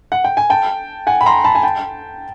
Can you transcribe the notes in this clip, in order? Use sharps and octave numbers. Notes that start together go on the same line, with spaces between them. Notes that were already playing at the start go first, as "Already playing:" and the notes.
F#5
G5
G#5
G5 A5
F#5 G#5
B5
A#5 C6
A5 B5
G#5
G5 A5